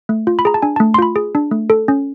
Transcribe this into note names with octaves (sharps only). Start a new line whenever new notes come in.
A3
F4
B5
G#4 A#5
A5
D4 G#5
A3 A5
C6
F4 B5
G#4
D4
A3
A4
C#4